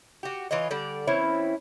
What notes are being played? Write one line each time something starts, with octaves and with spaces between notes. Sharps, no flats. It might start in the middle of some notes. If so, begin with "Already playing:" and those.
F#4 G4
E3 F4 C#5 D#5
D3 G3 D5
E3 C4 C#4 E4